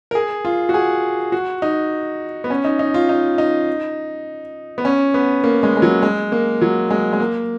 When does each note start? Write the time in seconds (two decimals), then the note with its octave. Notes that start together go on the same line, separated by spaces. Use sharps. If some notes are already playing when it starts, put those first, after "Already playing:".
0.11 A#4
0.15 G#4
0.45 F4
0.69 F#4
0.74 G#4
1.32 F#4
1.62 D#4
2.44 B3
2.50 C#4
2.64 D#4
2.79 D#4
2.94 F4
3.09 D#4
3.38 D#4
4.78 B3
4.85 C#4
5.14 B3
5.44 A#3
5.63 G#3
5.77 G#3
5.82 F#3
6.03 G#3
6.32 A#3
6.61 F#3
6.90 G#3
7.13 G#3
7.20 A#3